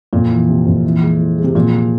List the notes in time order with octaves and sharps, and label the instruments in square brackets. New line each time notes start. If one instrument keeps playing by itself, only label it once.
[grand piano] F2 [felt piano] A#2
[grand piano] E3
C3
F2
E3
G#3
E4
G#3
[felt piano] C3
[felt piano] A#2 [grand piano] F3
[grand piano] C3